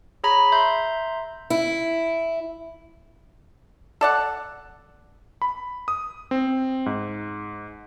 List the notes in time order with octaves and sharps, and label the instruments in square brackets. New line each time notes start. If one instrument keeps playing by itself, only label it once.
[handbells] G#4 C#5 A#5 B5 B6
E5 A#5 C6 G6
[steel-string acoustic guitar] E4
[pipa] A4 D5 F#5
[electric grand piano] B5
D#6
C4
G#2